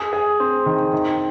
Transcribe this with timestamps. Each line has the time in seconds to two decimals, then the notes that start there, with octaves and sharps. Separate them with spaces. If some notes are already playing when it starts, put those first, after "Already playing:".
Already playing: G#4
0.13 G#4
0.40 C4
0.66 D#3
0.93 D#3